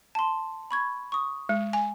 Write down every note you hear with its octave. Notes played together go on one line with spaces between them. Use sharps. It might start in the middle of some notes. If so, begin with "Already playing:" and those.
A5 C6
B5 C#6 G#6
C#6 D#6
G#3
G#5